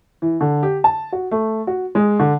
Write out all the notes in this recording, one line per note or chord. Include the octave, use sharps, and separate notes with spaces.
E3
D3
G4
A5
F#4
A3
F#4
G#3
D3